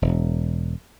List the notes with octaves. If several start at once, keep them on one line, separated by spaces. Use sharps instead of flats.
E1